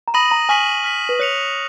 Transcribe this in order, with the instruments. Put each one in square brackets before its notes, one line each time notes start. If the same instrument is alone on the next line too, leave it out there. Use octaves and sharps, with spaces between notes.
[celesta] A#5
[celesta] B5 [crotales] D#6 A#6 D#7 F#7
[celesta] A#5
[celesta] G#5 [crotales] C#6 F6 B6 D#7 F#7
[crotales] F6 B6 F#7
[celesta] B4
[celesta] C#5 [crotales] F#6 C#7 F7